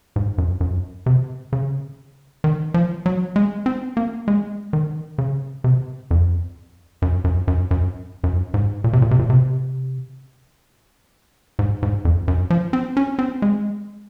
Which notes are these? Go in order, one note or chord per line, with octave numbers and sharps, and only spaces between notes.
G#2
F#2
F#2
C3
C#3
D#3
F3
F#3
G#3
C4
A#3
G#3
D#3
C#3
C3
F2
F#2
F#2
F#2
F#2
F#2
G#2
A#2
C3
A#2
C3
A#2
C3
G#2
G#2
F2
F#2
F3
C4
C#4
C4
G#3